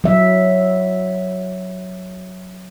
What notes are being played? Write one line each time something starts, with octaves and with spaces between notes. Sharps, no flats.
F#3 E5